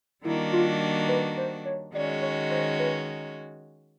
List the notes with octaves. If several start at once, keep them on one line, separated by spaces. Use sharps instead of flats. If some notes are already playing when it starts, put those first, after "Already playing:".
D#3 G3 A#3 D4 E4 F#4
F4
B4
C5
C#5
D#3 G#3 C#4 F#4 D5
C#5
C5
B4